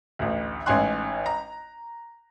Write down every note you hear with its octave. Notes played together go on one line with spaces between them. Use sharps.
A1 D2
A1 G#2 C#4 G#5 C6 F#6
A#5